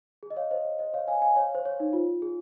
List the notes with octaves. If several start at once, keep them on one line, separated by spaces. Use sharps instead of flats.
G#4
D#5
C#5 F5
C5 D#5
C#5
C5 D#5
C#5 F5
F5 G#5
F5 G#5
C#5 F5
C5
C#5
D#4
F4
G#4